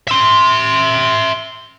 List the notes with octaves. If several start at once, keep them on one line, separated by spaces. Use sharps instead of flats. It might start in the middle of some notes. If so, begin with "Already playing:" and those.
E5 C6